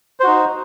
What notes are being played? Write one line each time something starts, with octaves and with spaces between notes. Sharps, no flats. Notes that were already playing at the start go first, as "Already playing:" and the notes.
D#4 F#4 C5